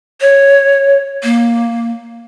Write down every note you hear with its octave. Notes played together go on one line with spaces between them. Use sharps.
C#5
A#3